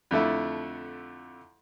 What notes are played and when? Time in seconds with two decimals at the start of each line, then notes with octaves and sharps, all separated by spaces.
0.11 F2 D3 A3 E4